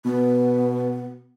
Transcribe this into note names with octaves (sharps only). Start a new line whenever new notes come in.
B2 B3